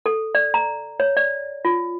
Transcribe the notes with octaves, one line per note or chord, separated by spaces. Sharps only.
A4
D5
A#5
C#5
D5
F4